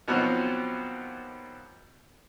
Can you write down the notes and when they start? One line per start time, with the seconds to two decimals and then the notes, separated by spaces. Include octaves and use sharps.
0.08 D#2 B2 F3 F#3 B3 C4